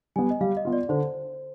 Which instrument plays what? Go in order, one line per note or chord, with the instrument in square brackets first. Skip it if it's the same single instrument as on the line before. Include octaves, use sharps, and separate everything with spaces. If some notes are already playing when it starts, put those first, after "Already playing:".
[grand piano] G3 B3 [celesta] G#5
[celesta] D#5
[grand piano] G3 [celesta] F5
[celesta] D#5
[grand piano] B3 F4
[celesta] D5
[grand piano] D3 [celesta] C5